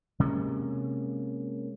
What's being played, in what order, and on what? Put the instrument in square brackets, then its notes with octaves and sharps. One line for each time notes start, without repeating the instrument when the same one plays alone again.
[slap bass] C3 G#3 A#3 C#4